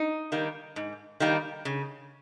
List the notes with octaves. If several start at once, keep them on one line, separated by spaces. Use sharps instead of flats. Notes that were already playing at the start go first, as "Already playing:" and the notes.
Already playing: D#4
D#3 G3 A#3
G#2
D#3 G3 A#3
C#3